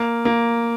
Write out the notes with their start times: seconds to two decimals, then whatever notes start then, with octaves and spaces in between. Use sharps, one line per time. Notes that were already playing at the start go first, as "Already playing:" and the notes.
Already playing: A#3
0.25 A#3